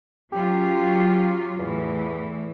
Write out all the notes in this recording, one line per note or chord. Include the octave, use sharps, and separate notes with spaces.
F#3 C#4 F4 G4
E2 A2 E3